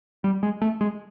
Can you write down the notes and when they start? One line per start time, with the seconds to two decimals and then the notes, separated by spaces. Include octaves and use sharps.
0.24 G3
0.43 G#3
0.62 A3
0.81 G#3